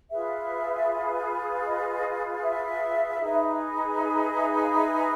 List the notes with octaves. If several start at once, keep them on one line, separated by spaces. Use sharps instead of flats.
F4 G#4 B4 E5
D#5
E5
D#4 G#4 B4
E5
F#5
F5
E5